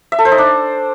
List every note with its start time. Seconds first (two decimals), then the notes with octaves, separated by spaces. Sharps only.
0.12 E5
0.19 A4
0.25 C5
0.32 D#4
0.38 D4